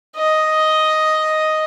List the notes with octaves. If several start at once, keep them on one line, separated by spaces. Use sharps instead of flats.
D#5